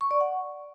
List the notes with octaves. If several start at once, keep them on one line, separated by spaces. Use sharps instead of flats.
C#6
D5
F#5